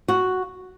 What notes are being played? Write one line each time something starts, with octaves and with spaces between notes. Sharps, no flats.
F#4